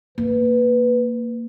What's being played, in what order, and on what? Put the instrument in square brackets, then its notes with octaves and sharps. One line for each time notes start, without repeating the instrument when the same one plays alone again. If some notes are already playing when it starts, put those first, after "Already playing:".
[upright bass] A#3 [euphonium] B4